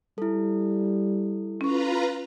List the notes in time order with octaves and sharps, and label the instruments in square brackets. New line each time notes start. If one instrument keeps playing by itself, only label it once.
[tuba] G3 [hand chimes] E4 A4
[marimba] C#4 C#6 [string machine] F4 B4 A#5